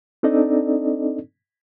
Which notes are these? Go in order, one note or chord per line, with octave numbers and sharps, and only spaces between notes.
C4 D4 D#4 A4 D5 D#5